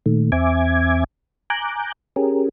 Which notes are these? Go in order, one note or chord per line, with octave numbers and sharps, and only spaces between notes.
A#2 D#3 A3
E2 C4 E5 G#5 D6 G#6
G#5 A#5 D6 F#6 G6
C#4 G4 G#4 A#4